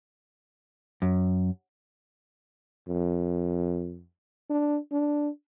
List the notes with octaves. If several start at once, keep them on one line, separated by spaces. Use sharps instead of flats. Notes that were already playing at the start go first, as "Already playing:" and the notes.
F#2
F2
D4
D4